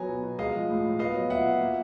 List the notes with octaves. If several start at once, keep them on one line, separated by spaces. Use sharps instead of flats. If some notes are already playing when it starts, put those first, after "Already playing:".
Already playing: F#3 B3 G#5 A#5
B2
B2
G#3 D#5 F5
F3
A2
A2
B3 D#5 F5
F#3
A#2 E5 F#5
A#2
A#3